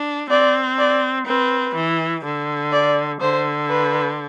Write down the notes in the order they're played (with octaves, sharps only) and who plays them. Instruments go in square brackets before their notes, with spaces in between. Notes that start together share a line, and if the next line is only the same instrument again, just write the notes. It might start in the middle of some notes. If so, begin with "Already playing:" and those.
Already playing: [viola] D4
[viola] C4 [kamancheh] D5
[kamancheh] D5
[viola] C4 [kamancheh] B4
[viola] E3
D3
[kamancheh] D5
[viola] D3 [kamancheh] C5
[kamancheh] B4